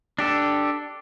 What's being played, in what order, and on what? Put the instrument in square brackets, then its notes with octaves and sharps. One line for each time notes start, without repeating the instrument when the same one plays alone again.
[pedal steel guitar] D4 G4 A4